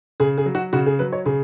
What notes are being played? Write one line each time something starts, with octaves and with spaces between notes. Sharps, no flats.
C#3 G#4
G#4
F#3
F#4
C#3 F#4
G#4
F#3 B4
C#5
C#3 G#4